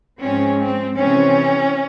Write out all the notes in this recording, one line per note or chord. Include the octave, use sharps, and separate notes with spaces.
G#2 F3 G#3 C4 C#4
C4
C3 E3 G3 C4 C#4